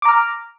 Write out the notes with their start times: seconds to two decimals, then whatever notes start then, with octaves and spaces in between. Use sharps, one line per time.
0.02 D6
0.05 A#5
0.09 F6